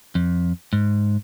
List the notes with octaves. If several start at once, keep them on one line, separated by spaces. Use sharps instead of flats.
F2
G#2